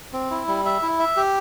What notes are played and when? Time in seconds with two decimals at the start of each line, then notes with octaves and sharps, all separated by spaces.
0.13 C4
0.31 E4
0.48 G3
0.65 E5
0.82 E4
0.99 E5
1.16 G4